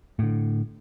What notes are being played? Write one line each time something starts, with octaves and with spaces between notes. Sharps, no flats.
A2 D3